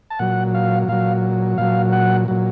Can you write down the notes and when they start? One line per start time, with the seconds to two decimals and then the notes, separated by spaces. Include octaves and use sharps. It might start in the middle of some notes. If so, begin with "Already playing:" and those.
0.10 A5
0.19 A#2 F#3 F#5
0.54 F5
0.88 A#2 F#3 F5
1.58 A#2 F#3 F5
1.92 F#5
2.28 A#2 F#3